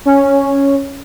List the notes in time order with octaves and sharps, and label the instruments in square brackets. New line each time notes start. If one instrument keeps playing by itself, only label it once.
[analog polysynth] C#4